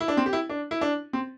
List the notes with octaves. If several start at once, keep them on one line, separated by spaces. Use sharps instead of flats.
E4
D4
C4
G4
E4
D4
E4
D4
C4